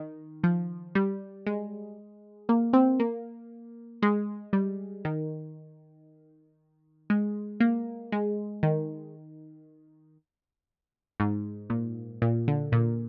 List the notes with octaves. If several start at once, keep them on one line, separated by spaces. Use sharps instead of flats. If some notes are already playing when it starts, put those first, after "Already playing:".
Already playing: D#3
F3
G3
G#3
A#3
C4
A#3
G#3
G3
D#3
G#3
A#3
G#3
D#3
G#2
A#2
A#2
D3
A#2